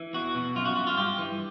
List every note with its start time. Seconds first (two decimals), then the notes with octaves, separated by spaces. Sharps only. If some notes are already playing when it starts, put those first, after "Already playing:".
Already playing: E3
0.13 E2 F#4
0.35 B2
0.55 F#2 F4
0.65 F#4
0.76 F#2 F#4
0.87 F4
0.97 G2 G4
1.18 E3